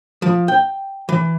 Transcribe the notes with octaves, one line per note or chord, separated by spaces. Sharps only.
F3
G5
E3